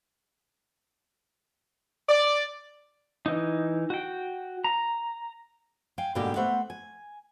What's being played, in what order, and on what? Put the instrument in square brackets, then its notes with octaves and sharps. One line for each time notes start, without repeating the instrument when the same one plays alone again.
[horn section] D5
[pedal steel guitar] E3 D#4
F#4 G5
A#5
[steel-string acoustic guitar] F5 G5 G#5
G#2 B2 D3 G3 A#3 G4
A3 B3 C5 E5 F#5
G#5